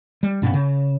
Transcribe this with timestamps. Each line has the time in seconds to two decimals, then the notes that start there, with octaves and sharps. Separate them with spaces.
0.23 G3
0.42 G2 B2 B3 C#4
0.54 C#3